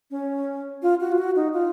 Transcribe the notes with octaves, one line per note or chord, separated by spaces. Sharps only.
C#4
F4
F#4
F4
F#4
D#4
F4